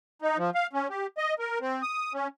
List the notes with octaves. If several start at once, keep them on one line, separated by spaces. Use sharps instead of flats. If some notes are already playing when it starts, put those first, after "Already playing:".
D#4
F3
F5
C#4
G4
D#5
A#4
C4
D#6
C#4